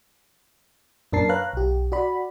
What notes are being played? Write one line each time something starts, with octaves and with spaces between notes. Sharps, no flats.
F#2 A#2 D4 A#4 A5 C7
B4 C#5 F5 A#5 F#6
B1 G4
F#4 D5 B5